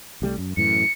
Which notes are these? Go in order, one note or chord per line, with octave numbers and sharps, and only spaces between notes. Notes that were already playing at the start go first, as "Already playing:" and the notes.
C2 G3 A3
F#2
F#2 A2 E3 C#7